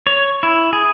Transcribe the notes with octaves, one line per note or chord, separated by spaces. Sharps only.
C#5
E4
G#4